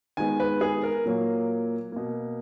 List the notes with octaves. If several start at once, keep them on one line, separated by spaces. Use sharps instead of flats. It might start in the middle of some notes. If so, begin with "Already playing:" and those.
D#3 G#3 B3 G#5
B4
G#4
A#4
A#2 F#3 A#3
B2 A#3